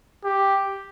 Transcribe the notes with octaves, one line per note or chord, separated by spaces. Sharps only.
G4